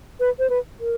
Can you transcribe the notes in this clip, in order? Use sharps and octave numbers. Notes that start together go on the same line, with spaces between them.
B4
C5
B4
A#4